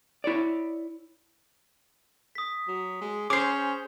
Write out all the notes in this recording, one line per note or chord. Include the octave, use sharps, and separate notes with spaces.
E4 C#5 D5
D#6 B6
F#3
G#3
C#4 G#4 C5 D6 C7